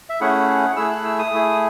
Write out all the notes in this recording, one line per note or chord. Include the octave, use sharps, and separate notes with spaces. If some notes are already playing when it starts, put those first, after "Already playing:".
E5
A3 C#4 E4 G#4 F#5
A3 E4 G#4 E6
F#6
E6
D#6
A3 E4 G#4